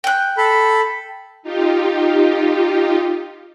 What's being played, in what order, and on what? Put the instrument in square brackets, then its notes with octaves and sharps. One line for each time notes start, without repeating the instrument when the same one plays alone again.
[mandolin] G5 F#6
[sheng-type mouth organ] A4 B5
[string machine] D#4 F4 G4